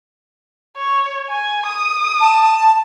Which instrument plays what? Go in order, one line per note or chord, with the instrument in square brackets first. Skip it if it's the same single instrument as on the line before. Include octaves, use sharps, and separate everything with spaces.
[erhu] C#5
G#5
D#6
[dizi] A5